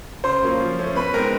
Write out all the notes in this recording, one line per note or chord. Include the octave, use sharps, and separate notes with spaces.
C#3 C5 C6
F#3 A#3 C#4 F4
F3
A3 C#4
B2 B4 B5
G#3 C4 D#4 A#4 A#5